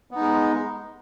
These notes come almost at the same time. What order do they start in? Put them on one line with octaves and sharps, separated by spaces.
B3 D#4 G#3